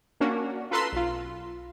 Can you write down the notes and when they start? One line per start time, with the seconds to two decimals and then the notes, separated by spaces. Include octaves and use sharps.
0.20 A#3 C#4 D4 F#4
0.71 F4 A4 B4 A#5 C6 E6
0.92 B1 F4